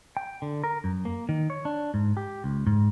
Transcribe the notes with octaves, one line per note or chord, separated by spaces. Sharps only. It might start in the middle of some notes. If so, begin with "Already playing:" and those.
G5
D3
A#4
F#2
A#3
D#3
C#5
D4
G#2
G4
C#2
G#2